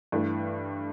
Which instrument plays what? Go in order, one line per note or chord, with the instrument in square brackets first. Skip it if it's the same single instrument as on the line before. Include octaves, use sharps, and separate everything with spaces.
[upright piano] G2 E3 A3